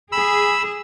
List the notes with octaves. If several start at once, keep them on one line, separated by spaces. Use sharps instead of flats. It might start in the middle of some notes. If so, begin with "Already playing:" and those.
G#4 B5 E6